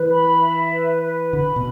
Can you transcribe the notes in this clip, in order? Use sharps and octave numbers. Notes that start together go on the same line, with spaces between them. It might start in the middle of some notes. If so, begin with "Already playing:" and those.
Already playing: E3 B4
B5
E5
B4
B4
D3 B5
B2